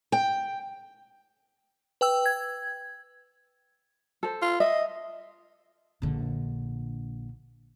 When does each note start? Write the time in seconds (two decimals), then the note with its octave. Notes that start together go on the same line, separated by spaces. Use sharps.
0.12 G5
2.01 B4 G5 E6
2.26 G#6
4.23 A4 C5
4.42 F4
4.60 D#5 E5
6.02 A#1 D3